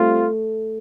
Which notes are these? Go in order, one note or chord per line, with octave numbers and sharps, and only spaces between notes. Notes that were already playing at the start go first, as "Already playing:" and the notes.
Already playing: G3 A3 C4 F4